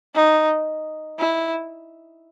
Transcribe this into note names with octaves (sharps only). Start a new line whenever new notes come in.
D#4
E4